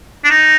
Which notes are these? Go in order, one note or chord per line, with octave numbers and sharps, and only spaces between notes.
D4
D#4